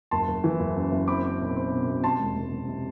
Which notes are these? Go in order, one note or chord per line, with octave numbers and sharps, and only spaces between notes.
F#1 A5 C6
F#1
E3
F#1
F#2
F#1
C4 B5 D6
C4
B1
C4
B2
B2
C3 A5 C6
E1
E1
C3
C3